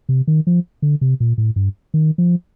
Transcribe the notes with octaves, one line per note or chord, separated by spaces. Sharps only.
C3
D#3
F3
D3
C3
A#2
A2
G2
D#3
F3